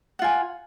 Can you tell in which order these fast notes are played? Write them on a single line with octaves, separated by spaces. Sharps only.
F#5 F4 G#5